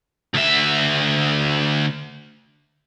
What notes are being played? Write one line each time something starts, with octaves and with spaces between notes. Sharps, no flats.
D2 E5